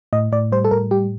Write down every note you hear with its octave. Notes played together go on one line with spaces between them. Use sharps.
A2 D#5
A2 D5
G3 C5
A4
A2 A#4
G3 G4